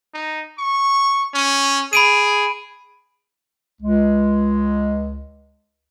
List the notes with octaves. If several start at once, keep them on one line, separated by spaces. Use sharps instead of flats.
D#4
C#6
C#4
G#4 B5 D7 D#7
C#2 G#3